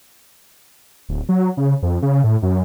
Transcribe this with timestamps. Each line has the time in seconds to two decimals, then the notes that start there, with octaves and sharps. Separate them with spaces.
1.09 D1
1.29 F#3
1.57 C#3
1.82 F2
2.03 C#3
2.24 A2
2.42 F#2